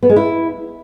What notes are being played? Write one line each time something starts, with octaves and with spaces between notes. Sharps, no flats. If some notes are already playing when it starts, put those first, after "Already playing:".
B3
G#3
E4